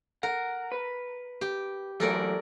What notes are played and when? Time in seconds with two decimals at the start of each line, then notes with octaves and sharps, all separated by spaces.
0.23 A#4 F#5
0.72 B4
1.41 G4
2.00 E3 F#3 A3 A4 A#4 D5